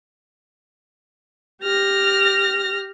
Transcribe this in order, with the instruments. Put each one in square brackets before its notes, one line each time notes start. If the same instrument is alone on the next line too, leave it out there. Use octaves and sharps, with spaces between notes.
[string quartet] G4 F6 A#6